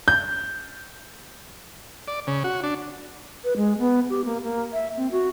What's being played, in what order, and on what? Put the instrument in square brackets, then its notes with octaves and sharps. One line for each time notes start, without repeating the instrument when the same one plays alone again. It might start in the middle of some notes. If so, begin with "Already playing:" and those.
[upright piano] G6
[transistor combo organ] D5
C#3
F#4
D4
[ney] B4
G#3
B3
G4
A#3
A#3
E5
C4
F#4